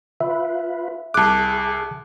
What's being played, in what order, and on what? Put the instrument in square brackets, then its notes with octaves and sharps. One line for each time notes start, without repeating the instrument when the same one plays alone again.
[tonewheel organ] F4 B4 [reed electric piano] E5
[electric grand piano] C2 D6 [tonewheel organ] G#4 [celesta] A5 F#6